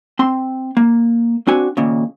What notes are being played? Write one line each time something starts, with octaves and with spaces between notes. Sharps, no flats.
C4 C6
A#3
C4 D4 F#4 G#5
D#2 A#2 C#3